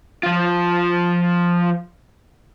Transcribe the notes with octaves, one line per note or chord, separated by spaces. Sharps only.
F3 F4